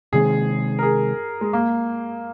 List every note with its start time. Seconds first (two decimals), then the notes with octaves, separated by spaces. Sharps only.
0.13 C3 D#3 G#3 C4 G#4
0.79 A#4
0.83 G#4
1.41 G#3
1.53 A#3